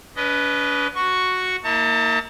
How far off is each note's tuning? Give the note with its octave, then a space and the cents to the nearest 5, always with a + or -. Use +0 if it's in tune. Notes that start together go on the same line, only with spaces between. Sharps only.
D4 -45 B4 +0 D#5 +0
F#4 +0 C#6 +0
A#3 -15 E4 -45 A5 +30